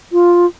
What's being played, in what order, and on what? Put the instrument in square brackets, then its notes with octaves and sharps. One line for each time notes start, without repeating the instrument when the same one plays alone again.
[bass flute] F4